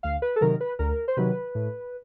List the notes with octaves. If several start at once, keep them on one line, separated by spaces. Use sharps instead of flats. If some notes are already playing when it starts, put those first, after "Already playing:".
D2 F5
B4
A4
C3 D#3 F#3 A#4
B4
D2 A#4
C5
C3 D#3 F#3 B4
A2